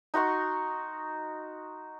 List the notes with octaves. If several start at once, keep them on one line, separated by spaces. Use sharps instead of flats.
D#4 F#4 C6 C#6